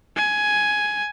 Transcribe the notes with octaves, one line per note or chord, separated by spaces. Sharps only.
G#5